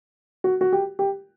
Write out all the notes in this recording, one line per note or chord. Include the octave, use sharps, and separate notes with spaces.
F#4
F#4
G4
G4